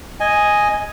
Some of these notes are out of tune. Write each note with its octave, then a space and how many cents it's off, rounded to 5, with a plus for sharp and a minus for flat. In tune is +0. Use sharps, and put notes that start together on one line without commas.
D#5 +0 G#5 +0